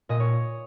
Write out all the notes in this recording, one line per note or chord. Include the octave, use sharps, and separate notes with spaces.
A#2 D#5
C#5